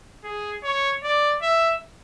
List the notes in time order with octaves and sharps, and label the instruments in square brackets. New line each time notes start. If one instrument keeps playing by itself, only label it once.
[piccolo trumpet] G#4
C#5
D5
E5